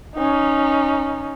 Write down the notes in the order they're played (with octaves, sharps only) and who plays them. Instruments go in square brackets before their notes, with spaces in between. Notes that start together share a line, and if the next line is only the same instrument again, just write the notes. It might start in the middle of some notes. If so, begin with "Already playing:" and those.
[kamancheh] C#4 D#4